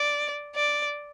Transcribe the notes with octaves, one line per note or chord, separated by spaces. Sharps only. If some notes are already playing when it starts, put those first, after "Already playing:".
Already playing: D5
D5